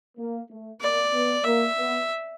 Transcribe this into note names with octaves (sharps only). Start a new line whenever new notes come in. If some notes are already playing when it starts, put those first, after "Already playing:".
A#3
A3
A#3 D5
B3
A#3 E5
B3